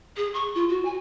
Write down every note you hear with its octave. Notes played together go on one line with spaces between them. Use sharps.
G#4
C#6
F4
F#4
G#5